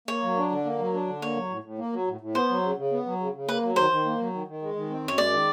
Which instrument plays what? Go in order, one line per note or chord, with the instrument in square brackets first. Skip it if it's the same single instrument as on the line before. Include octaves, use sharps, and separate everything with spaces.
[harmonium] A#3 [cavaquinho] C#5
[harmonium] F#3
D4
D3
A#3
F#3
D4
D3
[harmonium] A#3 [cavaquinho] C#5
[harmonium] F#3
A2
A2
A#3
F#3
A2
A2
[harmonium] B3 [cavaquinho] C5
[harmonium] F#3
C#3
C#3
B3
F#3
C#3
C#3
[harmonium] A#3 [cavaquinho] B4
[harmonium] F#3
[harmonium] D#3 [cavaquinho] C5
[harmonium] D#3
A#3
F#3
D#3
D#3
G#3
D#3
C4
[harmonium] F#2 [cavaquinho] C#5
[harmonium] G#3 [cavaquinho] D5
[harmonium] D#3